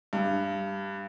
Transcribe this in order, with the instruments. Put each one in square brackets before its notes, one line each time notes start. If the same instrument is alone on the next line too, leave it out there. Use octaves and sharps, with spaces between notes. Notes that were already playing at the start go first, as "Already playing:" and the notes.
[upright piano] G2